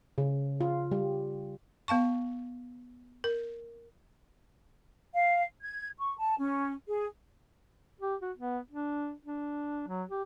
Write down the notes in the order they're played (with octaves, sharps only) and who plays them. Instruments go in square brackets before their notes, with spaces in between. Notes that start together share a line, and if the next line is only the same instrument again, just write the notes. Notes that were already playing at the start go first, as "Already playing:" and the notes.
[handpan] C#3
F4
G3
[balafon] B3 F5 A5 C#6
A#4
[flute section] F5
G#6
C#6
A5
C#4
G#4
[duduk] G4
F#4
B3
D4
D4
F#3
G4